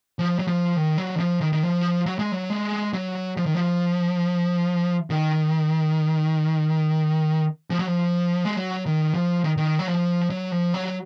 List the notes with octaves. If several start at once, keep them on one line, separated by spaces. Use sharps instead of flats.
F3
F#3
F3
D#3
F#3
D#3
F3
D#3
D#3
F3
F#3
G#3
F#3
G#3
F#3
F3
D#3
F3
D#3
F3
F#3
F3
G#3
F#3
D#3
F3
D#3
D#3
F#3
F3
F#3
F3
F#3